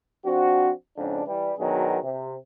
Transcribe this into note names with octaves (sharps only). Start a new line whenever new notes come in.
F3 C4 D4 F#4
F2 G#2 C#3 D4
E3 G3
B2 D#3 F#3 B3 D4 G#4
C3